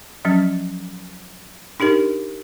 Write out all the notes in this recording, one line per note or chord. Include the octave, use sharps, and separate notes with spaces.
F3 F#3 C#4
D4 D#4 G4 A#4